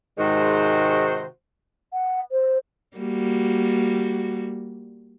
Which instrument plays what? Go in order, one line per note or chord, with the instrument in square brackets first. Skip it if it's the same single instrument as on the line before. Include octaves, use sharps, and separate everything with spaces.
[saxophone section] G#2 C3 D#3 G#3 F#4 C5
[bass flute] F#5
C5
[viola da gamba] G3 A#3 F#4